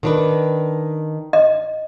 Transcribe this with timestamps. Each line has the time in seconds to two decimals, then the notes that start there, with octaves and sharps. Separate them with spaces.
0.03 D#3 D4 B4
1.33 D#5